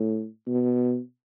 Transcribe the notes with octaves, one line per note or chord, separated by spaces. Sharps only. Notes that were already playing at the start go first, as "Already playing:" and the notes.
Already playing: A2
B2